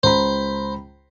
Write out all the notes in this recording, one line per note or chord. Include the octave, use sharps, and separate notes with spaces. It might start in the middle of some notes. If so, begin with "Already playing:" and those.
C#2 C5 A#5 B5